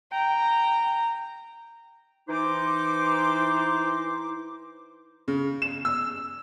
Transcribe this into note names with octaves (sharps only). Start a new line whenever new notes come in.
G5 A#5
E3 D#4 C5 D6
C#3
E7
E6